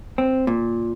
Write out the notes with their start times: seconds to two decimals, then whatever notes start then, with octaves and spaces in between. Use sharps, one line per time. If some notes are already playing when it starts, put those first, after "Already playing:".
0.18 C4
0.47 A#2